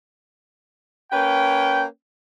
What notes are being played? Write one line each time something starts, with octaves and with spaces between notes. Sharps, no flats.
A#3 C#4 B4 G5